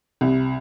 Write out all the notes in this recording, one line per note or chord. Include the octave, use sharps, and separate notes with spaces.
C2